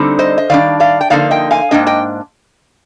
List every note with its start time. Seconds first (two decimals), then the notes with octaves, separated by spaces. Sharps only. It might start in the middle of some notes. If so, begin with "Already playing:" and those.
Already playing: D3 G3 C4 D#4
0.19 C5 D#5
0.38 D#5
0.50 D#3 G3 D4 D5 F5
0.80 D5 F5
1.01 G5
1.10 D3 F3 A#3 D#4 D5 F5
1.31 D#5 G5
1.51 F5 G#5
1.71 G#2 F3 A#3 D4 D#5 G5
1.87 D#5 G5